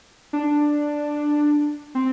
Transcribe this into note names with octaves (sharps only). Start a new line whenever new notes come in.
D4
C4